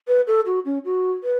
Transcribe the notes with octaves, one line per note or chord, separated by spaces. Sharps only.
B4
A4
F#4
C#4
F#4
B4